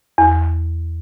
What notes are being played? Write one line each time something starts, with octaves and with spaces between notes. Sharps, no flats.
E2